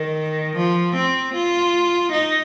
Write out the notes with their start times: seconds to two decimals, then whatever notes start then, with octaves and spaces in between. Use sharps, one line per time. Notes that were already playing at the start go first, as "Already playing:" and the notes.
Already playing: D#3
0.57 F3
0.96 C4
1.35 F4
2.13 D#4